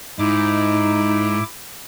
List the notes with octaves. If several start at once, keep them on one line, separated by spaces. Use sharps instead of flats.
G#2 D#4 E4 D6